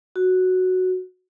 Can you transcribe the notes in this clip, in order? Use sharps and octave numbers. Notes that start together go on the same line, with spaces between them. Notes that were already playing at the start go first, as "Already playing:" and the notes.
F#4